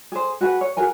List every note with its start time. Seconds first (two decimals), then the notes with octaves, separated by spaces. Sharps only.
0.12 G#4 C5
0.41 F#4 G#4 B4 F#5
0.61 C#5
0.77 F#4 G#4 A#4 G#5